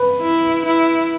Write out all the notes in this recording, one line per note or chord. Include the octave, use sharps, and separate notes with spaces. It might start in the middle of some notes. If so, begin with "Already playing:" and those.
Already playing: B4
E4
E4